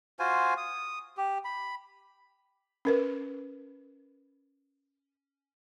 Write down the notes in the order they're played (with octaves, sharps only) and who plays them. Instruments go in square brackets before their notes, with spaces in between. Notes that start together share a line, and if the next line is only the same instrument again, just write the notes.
[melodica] F4 F#4 C5 G#5
D#6
G4
B5
[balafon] C#4 A#4 B4